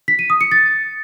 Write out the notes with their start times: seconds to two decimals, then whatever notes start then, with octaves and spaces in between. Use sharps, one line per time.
0.08 B6
0.19 D#7
0.30 D#6
0.41 C#7
0.52 A6